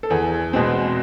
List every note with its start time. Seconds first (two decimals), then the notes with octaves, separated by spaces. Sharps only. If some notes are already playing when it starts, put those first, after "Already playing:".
0.03 A4
0.10 E2 G#4
0.53 B2 G#3 C4